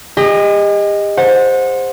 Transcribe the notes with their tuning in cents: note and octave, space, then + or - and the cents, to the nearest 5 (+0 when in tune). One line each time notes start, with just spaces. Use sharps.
G4 +45 D#5 +0
C5 +5 F#5 -25